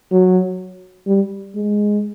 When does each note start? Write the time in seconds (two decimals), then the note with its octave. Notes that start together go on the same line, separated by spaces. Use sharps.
0.11 F#3
1.07 G3
1.56 G#3